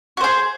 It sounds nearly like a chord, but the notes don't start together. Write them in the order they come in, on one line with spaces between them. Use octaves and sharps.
F#4 C5 G#4